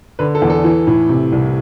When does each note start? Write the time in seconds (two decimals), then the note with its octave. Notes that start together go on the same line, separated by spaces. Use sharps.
0.19 D3 B4
0.35 A4
0.42 E2
0.50 A4
0.64 E3
0.87 A2
1.09 C3
1.32 C2